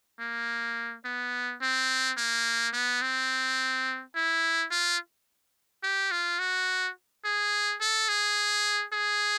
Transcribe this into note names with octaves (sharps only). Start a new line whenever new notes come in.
A#3
B3
C4
A#3
B3
C4
E4
F4
G4
F4
F#4
G#4
A4
G#4
G#4